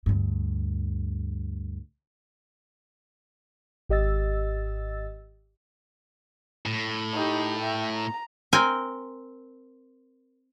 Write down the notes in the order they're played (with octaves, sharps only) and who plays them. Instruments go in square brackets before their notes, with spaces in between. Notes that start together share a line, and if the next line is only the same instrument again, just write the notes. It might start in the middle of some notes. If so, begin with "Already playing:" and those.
[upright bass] D2 G2
[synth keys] G#1 G4 D#5 E6 A6
[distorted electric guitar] A2
[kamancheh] D#4 G4
E5 G5
A#5
[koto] C4 A#4 G5 G#5